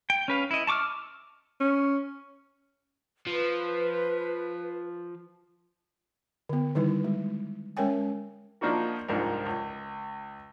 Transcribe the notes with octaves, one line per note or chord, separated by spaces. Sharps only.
G5
C#4 B4 F5
E4 D#5
A5 C#6 D6 E6 F6
C#4
F3 B4
D3 B3
D3 D#3 G3 D#4 E4 B4
G#3
G#3 C#4 A#4 C#5 G5 G#5
F3 A#3 D4 D#4 F#4 A#4
C2 G#2 F3 D4 A#4
C#2